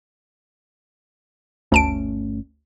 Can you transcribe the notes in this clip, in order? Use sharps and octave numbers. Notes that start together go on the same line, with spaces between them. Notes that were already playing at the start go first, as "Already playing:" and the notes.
G1 D2 A3 C#4 A5 D7